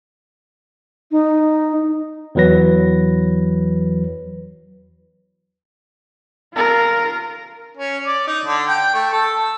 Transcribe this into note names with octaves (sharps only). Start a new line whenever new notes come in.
D#4
E2 E3 F#3 B4 A#6
F4 A#4
C#4
D5
D#4
D3
G5
A3
A4
E6